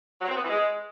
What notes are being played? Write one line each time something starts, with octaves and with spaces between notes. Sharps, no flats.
F#3
C4
B3
E3
G#3